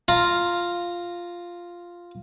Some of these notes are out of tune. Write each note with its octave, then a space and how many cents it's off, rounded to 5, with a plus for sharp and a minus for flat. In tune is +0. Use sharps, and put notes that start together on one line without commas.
F4 +0 A#5 -10